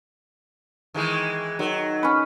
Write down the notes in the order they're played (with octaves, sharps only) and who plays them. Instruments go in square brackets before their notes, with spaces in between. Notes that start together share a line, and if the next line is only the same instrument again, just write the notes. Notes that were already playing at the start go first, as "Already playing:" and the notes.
[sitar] D#3 E3 G#3
[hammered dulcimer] D#3 [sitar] F#3
[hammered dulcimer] C#4 B4